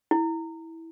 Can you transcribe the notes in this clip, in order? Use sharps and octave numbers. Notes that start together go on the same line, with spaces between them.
E4